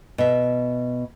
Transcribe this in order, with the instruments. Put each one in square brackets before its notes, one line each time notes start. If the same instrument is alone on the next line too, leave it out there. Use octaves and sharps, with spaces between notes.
[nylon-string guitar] B2 E5